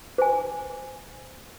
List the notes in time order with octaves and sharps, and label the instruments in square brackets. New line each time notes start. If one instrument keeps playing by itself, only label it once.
[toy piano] C5 G#5